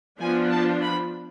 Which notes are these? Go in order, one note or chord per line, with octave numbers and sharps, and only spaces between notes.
F3 B3 D4 F4 G#5
A5
B5